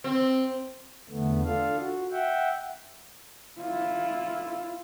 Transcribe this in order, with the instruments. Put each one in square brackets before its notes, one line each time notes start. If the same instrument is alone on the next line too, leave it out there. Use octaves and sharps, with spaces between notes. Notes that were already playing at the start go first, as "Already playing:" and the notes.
[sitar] C4
[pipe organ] E2 D3 A3 B3
D4 F4 A4 F5
F#4
E5 F#5 G5
[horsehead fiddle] E4 F4